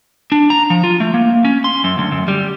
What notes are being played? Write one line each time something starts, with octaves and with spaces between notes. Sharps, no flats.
D4
A#5
F3
F4
A3
A#3
C#4
C6
F#2
D2
F#2
G3